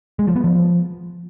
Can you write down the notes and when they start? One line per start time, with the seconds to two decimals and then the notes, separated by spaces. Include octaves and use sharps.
0.19 G#3
0.27 F3
0.36 B3
0.44 F3